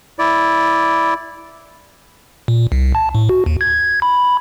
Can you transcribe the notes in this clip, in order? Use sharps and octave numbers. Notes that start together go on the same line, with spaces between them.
E4 D5
A#2
C2
A5
A2
F#4
D#2
G#6
B5